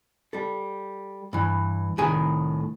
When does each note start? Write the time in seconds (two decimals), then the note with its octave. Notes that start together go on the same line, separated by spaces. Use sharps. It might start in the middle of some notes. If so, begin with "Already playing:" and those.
0.33 G3 A4
1.33 G2 E3
1.98 C2 A2 D#3 G#4 G#5